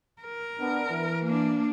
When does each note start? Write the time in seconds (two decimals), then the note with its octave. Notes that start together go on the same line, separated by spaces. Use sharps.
0.22 A#4
0.59 B3 D4
0.89 E3
1.25 A#3 D4